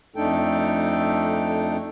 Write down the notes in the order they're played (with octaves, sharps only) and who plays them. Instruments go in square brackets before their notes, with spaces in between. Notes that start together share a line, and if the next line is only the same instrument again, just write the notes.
[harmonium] F2 A3 D4 D#4 A4 G5